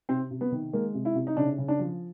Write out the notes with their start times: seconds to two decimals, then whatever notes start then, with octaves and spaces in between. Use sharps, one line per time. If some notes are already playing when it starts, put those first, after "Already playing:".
0.09 C3 C4
0.31 C3
0.41 B3
0.52 D#3
0.73 G#3 A#3
0.94 C3
1.05 E4
1.15 C3
1.27 D#4
1.37 C#3 D4
1.58 C#3
1.68 D4
1.79 F3